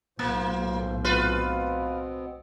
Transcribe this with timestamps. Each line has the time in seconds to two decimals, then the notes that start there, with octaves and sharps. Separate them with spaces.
0.19 B1 A2 A#3 F4 C5
1.04 B2 B3 C4 F4 B4